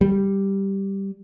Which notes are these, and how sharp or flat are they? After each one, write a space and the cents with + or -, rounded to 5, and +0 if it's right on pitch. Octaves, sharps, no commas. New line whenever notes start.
G3 +0